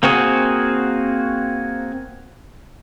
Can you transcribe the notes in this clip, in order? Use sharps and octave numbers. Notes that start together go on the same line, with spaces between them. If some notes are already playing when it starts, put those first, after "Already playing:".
A#3 C4 F#4 G#4